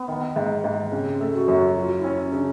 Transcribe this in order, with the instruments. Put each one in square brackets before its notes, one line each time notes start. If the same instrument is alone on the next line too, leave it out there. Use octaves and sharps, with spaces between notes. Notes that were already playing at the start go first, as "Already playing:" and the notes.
Already playing: [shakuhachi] B3
[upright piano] D#3
G#2
G#2
[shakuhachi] B3
[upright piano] C#3 [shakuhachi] C4
[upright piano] A3
[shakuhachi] F#4
[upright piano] F#2
[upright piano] F#3 [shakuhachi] F4
[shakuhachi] E4
[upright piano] C#4
[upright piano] C#3 [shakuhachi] D4